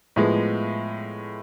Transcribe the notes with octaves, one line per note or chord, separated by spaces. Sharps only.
A2 F3 G#3 B3